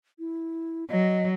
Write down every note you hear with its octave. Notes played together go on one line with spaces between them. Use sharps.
E4
F#3 D#5